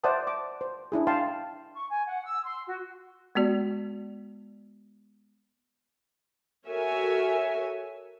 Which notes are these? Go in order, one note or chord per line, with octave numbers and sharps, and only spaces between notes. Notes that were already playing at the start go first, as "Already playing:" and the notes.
C5 D5 E5 F#5 A5 D#6
D6
C5
D4 E4 G#4
F5 G5 A5 C6
C#6
G#5
F#5
E6
C6
F#4
G#3 B3 F#4 D5
F#4 A4 A#4 C#5 E5 G#5